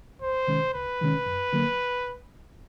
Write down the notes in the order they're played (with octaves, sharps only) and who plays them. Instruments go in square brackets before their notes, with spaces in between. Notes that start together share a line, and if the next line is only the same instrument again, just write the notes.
[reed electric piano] C#2 [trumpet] C5
[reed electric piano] C3 D#3 G#3 C#4
[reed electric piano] C#2 [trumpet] B4
[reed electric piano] C3 D#3 G#3 C#4
F#2
D3 F#3 A#3